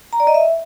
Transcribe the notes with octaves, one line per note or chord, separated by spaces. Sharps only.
A#5
D5
D#5
E5